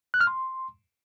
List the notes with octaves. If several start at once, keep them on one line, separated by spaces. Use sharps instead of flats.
F#6
F6
C6